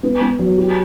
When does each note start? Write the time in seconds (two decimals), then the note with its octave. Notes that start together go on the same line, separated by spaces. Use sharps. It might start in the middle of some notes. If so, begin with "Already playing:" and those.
0.03 B3
0.21 B3
0.39 F#3
0.58 G4